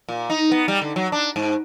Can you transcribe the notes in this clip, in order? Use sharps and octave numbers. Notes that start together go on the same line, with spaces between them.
A#2
D#4
B3
G3
D3
F#3
D4
G#2